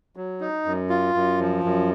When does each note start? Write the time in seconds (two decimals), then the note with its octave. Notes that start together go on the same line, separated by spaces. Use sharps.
0.16 F#3
0.41 D#4
0.66 F#2
0.89 F4
1.14 F#2
1.40 F3
1.64 F#2